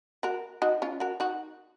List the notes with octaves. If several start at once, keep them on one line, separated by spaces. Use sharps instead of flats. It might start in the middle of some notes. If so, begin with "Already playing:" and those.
F#4 A#4
D#4 F#4
C#4 F4
F#4 A#4
D#4 F#4